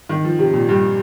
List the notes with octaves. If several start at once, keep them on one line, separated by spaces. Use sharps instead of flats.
D#3
F3
C3
A#2
G2